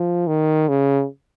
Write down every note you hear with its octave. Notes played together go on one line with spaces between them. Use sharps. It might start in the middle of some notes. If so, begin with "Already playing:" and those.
Already playing: F3
D#3
C#3